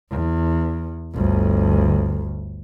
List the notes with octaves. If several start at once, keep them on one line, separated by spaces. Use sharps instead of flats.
E2
G1 D2